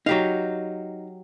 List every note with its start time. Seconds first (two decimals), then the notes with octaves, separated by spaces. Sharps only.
0.06 F#3 D#4 G4 F5